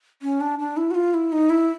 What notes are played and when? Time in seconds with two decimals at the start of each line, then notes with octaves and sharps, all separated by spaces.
0.22 C#4
0.41 D4
0.59 D4
0.77 E4
0.91 F#4
0.95 F4
1.14 E4
1.32 D#4
1.50 E4